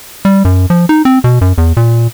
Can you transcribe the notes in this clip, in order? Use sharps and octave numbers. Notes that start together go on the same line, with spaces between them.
G3
F#2
F3
D#4
C4
B2
F#2
E2
A#2